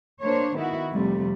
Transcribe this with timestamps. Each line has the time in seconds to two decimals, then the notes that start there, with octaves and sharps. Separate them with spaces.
0.21 A#3 D4 C5 C#5
0.56 D#3 B3 E4 F#4
0.91 F2 C3 G3 A3